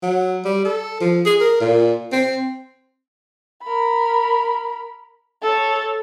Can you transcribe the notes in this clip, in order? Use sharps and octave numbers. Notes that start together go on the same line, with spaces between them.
F#3
G3
A4
F3
G#4
A#4
A#2
C4
A#4 B5
A4 C#5